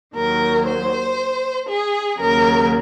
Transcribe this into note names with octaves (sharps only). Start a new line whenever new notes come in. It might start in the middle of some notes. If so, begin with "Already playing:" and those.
D#2 D#3 F#3 A#4
C5
G#4
D#2 C#3 F#3 A#4